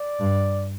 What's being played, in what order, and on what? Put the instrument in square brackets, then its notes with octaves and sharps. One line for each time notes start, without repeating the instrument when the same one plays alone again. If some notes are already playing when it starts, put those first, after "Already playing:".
Already playing: [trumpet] D5
[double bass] G2